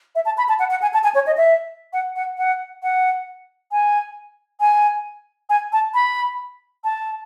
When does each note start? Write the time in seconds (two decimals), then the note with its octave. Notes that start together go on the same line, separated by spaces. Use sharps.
0.15 E5
0.25 A5
0.38 B5
0.49 A5
0.59 F#5
0.70 F#5
0.82 G#5
0.94 A5
1.04 G#5
1.15 C#5
1.27 D#5
1.37 E5
1.93 F#5
2.16 F#5
2.38 F#5
2.83 F#5
3.72 G#5
4.60 G#5
5.50 G#5
5.73 A5
5.94 B5
6.84 A5